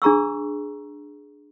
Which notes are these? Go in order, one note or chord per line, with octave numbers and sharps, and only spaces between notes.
D4 G#4 A#5 C#6 E6